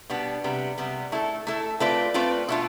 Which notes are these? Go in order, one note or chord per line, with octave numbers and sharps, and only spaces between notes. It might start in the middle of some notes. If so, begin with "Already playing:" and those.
B2 G3 B3 D4
C3 G3 B3
C3 G3 B3
A3 E4 A4
A3 E4 A4
A3 C4 F4 B4 D5
A3 C4 F4 B4 D5
B2 A3 D4 F4